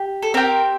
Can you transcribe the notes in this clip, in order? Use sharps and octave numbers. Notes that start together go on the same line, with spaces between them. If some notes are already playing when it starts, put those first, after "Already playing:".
Already playing: G4
A4
C4 G4 A#4